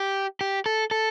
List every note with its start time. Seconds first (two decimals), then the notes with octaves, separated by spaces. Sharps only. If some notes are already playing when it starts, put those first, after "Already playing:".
Already playing: G4
0.41 G4
0.66 A4
0.91 A4